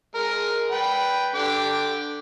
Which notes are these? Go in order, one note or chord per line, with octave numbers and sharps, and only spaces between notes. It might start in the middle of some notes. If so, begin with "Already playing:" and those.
G#3 A#4
B4 G5
D3 G5 D6